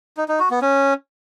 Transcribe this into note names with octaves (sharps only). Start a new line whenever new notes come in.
D#4
D#4
F#4
B3
C#4